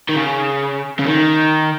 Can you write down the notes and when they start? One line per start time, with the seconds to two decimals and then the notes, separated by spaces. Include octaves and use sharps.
0.09 D#3
0.16 C#3
0.99 C#3
1.06 D#3